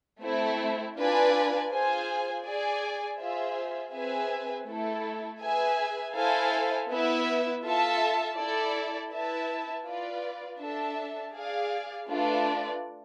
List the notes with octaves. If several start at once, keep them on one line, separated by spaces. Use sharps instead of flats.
A3 C4 E4
D4 F4 B4 D5 G#5
F4 G#4 C5 G#5
G#4 D5 G#5
F4 G#4 C5 E5
C4 G#4 B4 E5 G#5
A3 E4 A4
G#4 B4 E5 G#5
E4 A4 C5 F5 G#5
B3 E4 B4 E5
F4 A4 E5 A5
E4 A4 D5
E4 B4 E5 A5
F4 B4 D5
D4 A4 E5 A5
G#4 D5 F5
A3 D4 F4 B4 D5